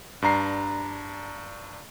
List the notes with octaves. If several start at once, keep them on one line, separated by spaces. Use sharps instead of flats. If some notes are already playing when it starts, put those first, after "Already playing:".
G2 D4 A#5 C7